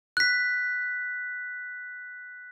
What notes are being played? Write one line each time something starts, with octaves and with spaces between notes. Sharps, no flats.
F#6 B6